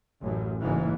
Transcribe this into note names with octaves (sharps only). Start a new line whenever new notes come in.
A1 F#2
F#1 G#2 E3 A#3